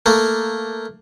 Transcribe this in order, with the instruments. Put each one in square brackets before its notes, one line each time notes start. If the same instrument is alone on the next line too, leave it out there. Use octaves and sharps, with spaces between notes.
[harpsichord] A3 A#3